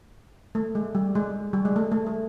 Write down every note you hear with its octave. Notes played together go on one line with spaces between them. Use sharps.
A3
G#3
G3
G#3
G3
G#3
A3
A3
A3